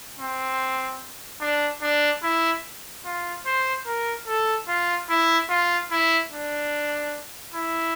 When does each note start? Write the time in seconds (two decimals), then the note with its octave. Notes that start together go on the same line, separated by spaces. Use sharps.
0.19 C4
1.41 D4
1.82 D4
2.23 E4
3.05 F4
3.46 C5
3.86 A#4
4.27 A4
4.68 F4
5.10 E4
5.50 F4
5.91 E4
6.32 D4
7.54 E4